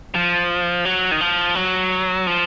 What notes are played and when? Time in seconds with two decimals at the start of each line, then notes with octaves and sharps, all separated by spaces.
0.15 F3
0.85 F#3
1.11 D#3
1.21 F3
1.55 F#3
2.27 F3